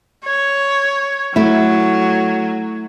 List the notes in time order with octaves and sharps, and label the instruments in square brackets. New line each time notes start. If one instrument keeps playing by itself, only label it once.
[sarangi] C#5
[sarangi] F#3 [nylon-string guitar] A3 E4